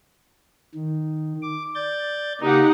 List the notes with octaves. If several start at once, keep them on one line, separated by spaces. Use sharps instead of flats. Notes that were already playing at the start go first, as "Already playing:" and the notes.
D#3
D6
D5 G6 A6
C#3 A#3 D#4 G4 F#5